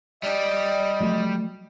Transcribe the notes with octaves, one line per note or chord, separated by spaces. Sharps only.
G3 G4 D5 D#5
F3 F#3 A3